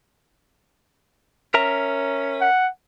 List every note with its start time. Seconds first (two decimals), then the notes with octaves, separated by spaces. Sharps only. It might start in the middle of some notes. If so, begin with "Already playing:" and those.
1.54 C#4 A#4 E5 A#5
2.41 F#5